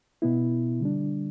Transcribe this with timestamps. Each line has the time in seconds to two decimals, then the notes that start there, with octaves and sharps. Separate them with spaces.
0.22 B2 B3 E4
0.80 D3 G3 D4